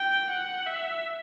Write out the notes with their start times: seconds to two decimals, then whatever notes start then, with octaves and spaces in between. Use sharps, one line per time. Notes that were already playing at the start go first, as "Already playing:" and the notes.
Already playing: G5
0.29 F#5
0.66 E5